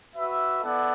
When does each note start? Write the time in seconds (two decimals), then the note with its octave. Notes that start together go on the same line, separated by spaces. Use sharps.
0.15 F#4 B4 E5
0.63 B3 E4 A4 D5 F#5